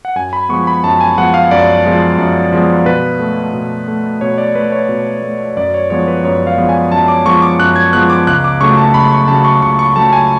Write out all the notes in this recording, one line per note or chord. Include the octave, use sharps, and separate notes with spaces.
F#5
F#2 G#5
B5
F3 G#3 B3 C#6
B5
F#2 A5
G#5
F3 G#3 B3 F#5
F5
F#2 D5
F3 G#3 B3
F#2
F3 G#3 B3
B2 B4
A3
B2
A3
B2 C#5
D5
A3 B4
C#5
B2
A3
F#2 D5
C#5
F3 G#3 B3 C#5
B4
F#2 C#5
F5
F3 G#3 B3
G#5
F#2 A5
D6
F3 G#3 B3 C#6
D6
F#2 F#6
G#6
F3 G#3 B3 F#6
D6
C#2 F#6
D6
C#3 F#3 A3 C#6
A5
C#2 B5
C#6
C#3 F#3 A3 A5
C#6
C#2 C#6
C#6
C#3 F#3 A3 A5
G#5